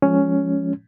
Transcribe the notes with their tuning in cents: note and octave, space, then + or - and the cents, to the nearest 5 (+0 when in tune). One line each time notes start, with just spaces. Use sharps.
F3 +0 G#3 +0 C#4 +5